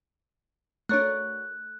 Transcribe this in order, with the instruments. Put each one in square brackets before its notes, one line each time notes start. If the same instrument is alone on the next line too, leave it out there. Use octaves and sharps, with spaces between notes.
[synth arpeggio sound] A3 D4 [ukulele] F#4 A#4 C#5 [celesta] F#6